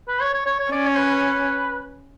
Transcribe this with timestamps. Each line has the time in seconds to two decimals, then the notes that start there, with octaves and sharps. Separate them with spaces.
0.08 B4
0.21 C#5
0.33 C#5
0.46 C#5
0.59 C#5
0.72 C#4 D5
0.86 C#5
0.98 B4
1.11 B4